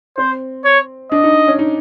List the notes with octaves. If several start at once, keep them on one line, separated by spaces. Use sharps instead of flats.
C4 C5
C#5
D4 D#5
D#4
C#4
D#4